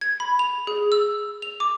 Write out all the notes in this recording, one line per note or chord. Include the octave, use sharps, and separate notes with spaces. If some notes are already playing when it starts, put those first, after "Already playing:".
G#6
B5
F7
G#4
E6
F7
D6